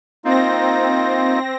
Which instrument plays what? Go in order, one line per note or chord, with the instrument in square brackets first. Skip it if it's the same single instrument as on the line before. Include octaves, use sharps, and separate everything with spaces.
[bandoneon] A#3 D#4 F4 [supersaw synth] C4 A#6